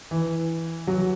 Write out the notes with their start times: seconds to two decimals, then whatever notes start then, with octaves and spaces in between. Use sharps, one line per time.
0.11 E3
0.87 F#3